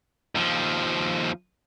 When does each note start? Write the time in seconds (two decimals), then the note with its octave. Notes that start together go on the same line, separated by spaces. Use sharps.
0.35 D#2 F3